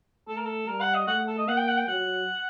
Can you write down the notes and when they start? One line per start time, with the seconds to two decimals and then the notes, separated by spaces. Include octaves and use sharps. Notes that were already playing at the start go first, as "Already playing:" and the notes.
0.28 A3 A4
0.37 A#4
0.45 A4
0.67 G3 A#4
0.81 F#5
0.94 D#5
1.07 A3 F#5
1.27 A4
1.38 D#5
1.48 A#3 F#5
1.57 G5
1.68 F#5
1.77 G5
1.88 F#3 F#5